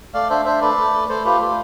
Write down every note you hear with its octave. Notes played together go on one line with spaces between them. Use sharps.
A3 D5 F5
D4 C5 E5
D4 C5 E5
A3 B4 D5
A3
A3
A3 A4 C5
F4 G4 B4
A3 G4